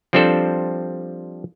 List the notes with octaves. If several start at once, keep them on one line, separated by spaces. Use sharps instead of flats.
F3 G3 C4 D4 A4 C5